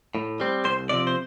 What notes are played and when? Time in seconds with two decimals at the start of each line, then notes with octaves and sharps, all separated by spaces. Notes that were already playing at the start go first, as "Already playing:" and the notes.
0.15 A2
0.40 G3 C4
0.65 C2 C5
0.89 C3 F3 C4 D5
1.07 C5